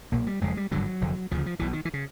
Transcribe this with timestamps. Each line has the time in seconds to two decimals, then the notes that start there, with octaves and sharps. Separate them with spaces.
0.12 B1 A#2 A#3
0.27 G3
0.41 F#1 F2 C#3 G#3
0.57 G3
0.71 G#1 G2 D3 F#3
1.01 F1 F2 D3
1.31 D2 C#3 F3
1.46 F3
1.59 B1 B2 E3
1.73 D#3
1.85 E3
1.94 C#3